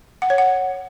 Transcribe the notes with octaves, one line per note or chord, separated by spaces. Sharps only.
F#5
C#5
F#5